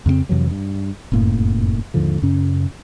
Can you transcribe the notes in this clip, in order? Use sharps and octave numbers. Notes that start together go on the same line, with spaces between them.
F2 C#3 A#3 C4
F2 C3 E3 F#3
G2
F1 F#2 A2 A#3
D#2 G#2 D3 F3
F#2 C#3 C#4